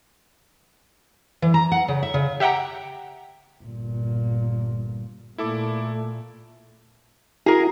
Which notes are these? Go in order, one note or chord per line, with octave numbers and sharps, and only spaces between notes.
E3
A#5
F#5
C#3
E5
C#3
G4 E5 F#5 G5 A#5
G1 A#2
A#2 A3 E4 A4 D6
E4 F#4 G#4 A#4